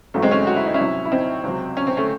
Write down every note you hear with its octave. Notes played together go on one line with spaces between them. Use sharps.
A1 G#2 F#3 A3
G#3 C4
A3 C#4
F#4
E4
D#4
C#4 E4
C2 C3 F#3
E4
C4 D#4
C#2 C3 F#3
C#4
C4
A3 C#4